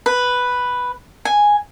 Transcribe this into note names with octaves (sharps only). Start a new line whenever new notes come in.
B4
G#5